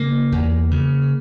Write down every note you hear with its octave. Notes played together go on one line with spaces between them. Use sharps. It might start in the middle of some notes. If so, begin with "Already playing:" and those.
Already playing: C#3 A#3
E2
C#3